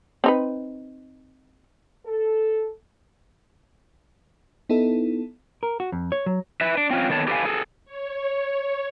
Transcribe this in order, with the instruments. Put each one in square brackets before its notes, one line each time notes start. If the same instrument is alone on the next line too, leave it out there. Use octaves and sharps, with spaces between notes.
[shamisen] C4 D#4 B4
[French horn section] A4
[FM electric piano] B3 D#4 E4 A4
[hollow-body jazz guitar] A#4
F#4
F2
C#5
F#3
[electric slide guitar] B4 E5
D4
C4 C#4 F4
D#3 B3 A4 C#5 A5
G4 A4 B4 C5 F5 G#5
G#4 A4
[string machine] C#5